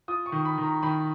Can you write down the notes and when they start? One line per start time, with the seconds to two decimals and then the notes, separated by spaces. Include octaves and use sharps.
0.08 F4 D#6
0.26 C#6
0.32 D#3
0.45 B5
0.58 D#3
0.63 A#5
0.83 D#3 B5